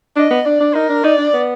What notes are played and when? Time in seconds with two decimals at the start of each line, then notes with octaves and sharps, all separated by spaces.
0.16 D4 D#5
0.31 B3
0.46 D4 D5
0.60 D4
0.75 D#4 A#4
0.89 D4
1.04 D#4 D5
1.18 D4
1.33 B3